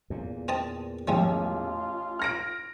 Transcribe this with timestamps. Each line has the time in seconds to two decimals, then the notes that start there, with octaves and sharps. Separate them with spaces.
0.10 E2 A#2
0.48 C4 D#5 A5
1.08 A1 F3 G3 G#3 F4
2.19 F6 A#6 D7